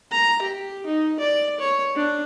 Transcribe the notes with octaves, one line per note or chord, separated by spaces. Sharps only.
A#5
G4
D#4
D5
C#5
D4